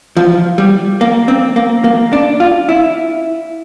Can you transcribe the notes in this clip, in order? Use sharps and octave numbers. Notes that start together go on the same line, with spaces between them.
F3
G3
A#3
C4
A#3
A#3
D4
F4
E4